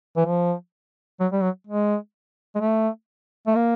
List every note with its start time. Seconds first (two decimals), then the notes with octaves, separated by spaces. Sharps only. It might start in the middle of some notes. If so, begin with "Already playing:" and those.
0.17 E3
0.25 F3
1.20 F#3
1.32 G3
1.42 F#3
1.67 G#3
2.55 G#3
2.60 A3
3.47 A3
3.55 A#3